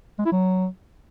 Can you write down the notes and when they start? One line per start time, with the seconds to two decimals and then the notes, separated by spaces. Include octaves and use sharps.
0.19 G#3
0.25 E4
0.32 F#3